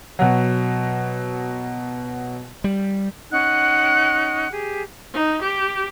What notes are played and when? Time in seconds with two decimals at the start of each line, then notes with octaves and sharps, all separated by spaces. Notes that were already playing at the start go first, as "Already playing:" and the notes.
0.19 B2 F#3
2.64 G3
3.31 C#4 D#4 F#5 F#6
4.50 G4 G#4
5.14 D#4
5.42 G4